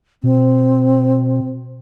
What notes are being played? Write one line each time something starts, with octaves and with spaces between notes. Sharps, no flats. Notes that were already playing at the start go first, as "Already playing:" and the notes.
B2 C4